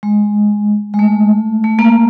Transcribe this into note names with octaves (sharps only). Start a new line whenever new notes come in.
G#3
G#3
A3
A3
A#3